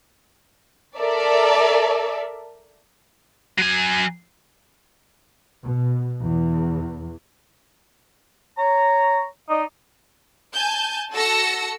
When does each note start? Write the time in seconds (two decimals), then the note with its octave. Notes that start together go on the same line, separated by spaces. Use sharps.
0.97 A4 A#4 D5 E5
3.59 F#3 G#5
5.63 B2
6.22 E2
8.57 C#5 A#5
9.49 D#4 D5 D#5
10.54 G#5 A5 G6
11.13 F#4 A4 E6 A#6 C#7